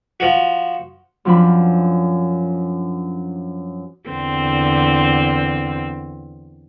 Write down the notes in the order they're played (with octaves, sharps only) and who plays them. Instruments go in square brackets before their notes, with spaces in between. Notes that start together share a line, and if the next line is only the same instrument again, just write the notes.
[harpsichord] F3 F#4
[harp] F#2 F3 C4 D4 B5
[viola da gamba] E2 D3 C4